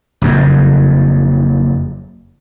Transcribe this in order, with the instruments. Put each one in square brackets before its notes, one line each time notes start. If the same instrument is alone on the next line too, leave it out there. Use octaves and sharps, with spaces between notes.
[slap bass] F#1 F2